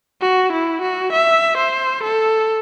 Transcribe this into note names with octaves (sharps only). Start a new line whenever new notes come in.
F#4
E4
F#4
E5
C5
A4